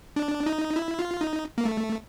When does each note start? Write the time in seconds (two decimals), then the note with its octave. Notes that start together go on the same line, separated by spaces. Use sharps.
0.16 D4
0.46 D#4
0.76 E4
0.99 F4
1.21 D#4
1.58 A#3
1.65 A3